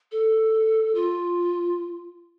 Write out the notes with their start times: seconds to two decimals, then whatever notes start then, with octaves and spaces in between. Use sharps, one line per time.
0.12 A4
0.95 F4